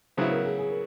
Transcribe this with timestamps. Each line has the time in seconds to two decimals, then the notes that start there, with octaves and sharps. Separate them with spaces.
0.17 C#3 F#3 B3 E4 C5
0.31 A#4
0.45 G#4
0.58 G#4
0.70 A#4